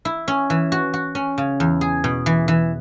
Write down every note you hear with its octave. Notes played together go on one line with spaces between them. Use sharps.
E4
C#4
E3
F#4
F#4
C#4
C#3
E2
G#4
B2
E3
E3